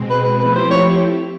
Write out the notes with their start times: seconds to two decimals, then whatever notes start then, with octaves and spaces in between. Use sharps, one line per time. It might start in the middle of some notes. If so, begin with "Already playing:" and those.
Already playing: B2 G#3 C4
0.10 B4
0.25 B4
0.40 F3 A3 C4 E4 G4 B4
0.55 C5
0.71 C#5